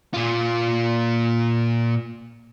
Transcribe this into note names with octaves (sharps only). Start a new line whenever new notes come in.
A#2 F4